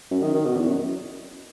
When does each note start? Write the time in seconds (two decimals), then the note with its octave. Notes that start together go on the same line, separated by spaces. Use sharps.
0.11 F#2
0.22 D#3
0.34 D#3
0.45 B2
0.57 E2
0.68 F#2